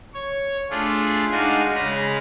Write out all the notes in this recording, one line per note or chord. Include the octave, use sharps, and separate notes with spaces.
C#5
A3 D4 F4 G#4
G#3 D4 D#4 F#4 F5 G#5
C#3 G#3 A#5 B5